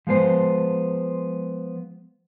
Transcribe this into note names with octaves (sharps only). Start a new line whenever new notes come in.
F3 G#3 B3 C5